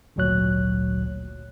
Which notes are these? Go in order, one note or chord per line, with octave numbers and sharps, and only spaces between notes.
G#1 D2 A#2 F#3 C#5 F#6